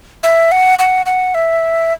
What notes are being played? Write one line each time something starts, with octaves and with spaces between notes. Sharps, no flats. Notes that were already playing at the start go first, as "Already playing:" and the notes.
E5
F#5
F#5
F#5
E5